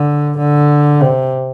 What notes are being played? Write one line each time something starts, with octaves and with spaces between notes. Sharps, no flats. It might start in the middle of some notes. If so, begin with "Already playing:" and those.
Already playing: D3
D3
C3